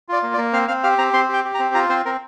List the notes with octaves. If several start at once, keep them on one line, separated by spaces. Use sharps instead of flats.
F4 D5
A#3
D5
A#3
C4 F5
C4 F5
G4 F5
C4 A#5
C4 C6
G4 G5
G4
A#5
C4
F4 A#5
C4 C5
C4 A#4